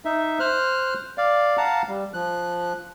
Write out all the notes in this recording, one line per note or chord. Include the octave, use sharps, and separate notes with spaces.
D#4 E5
C5 F6 F#6
D5 F5
F5 F#5 A5 A#5
G3
F3 F#6